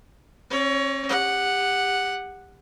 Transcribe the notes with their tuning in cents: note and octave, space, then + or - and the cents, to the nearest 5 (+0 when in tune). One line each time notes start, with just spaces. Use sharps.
C#4 -40 C#5 +25
G4 +25 F#5 +0